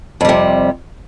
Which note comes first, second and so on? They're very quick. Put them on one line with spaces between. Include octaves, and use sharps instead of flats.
F2 G3 C3